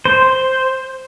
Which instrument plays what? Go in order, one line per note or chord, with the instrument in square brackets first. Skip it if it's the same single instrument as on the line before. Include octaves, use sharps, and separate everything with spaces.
[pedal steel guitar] C5